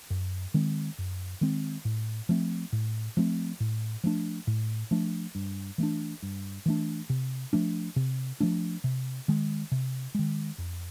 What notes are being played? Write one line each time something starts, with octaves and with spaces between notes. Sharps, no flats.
F#2
D#3 G#3 C4
F#2
D#3 G#3 C4
A2
F3 A3 C4
A2
F3 A3 C4
A2
F3 A3 D4
A2
F3 A3 D4
G2
E3 A3 D4
G2
E3 A3 D4
C3
F3 A3 D4
C3
F3 A3 D4
C3
D#3 G#3
C3
D#3 G#3
F2